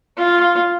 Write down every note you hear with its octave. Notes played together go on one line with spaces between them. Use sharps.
F4